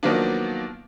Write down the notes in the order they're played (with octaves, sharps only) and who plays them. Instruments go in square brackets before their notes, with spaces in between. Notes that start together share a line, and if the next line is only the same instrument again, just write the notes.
[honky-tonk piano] D#3 F3 F#3 A#3 B3 D4